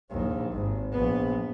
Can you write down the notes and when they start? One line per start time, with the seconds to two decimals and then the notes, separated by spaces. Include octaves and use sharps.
0.10 A#1 D#2
0.52 G#1
0.92 A#1 B3